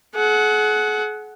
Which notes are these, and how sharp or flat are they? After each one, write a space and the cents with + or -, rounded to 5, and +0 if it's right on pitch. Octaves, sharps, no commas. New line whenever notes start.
G#4 +45 F#5 +0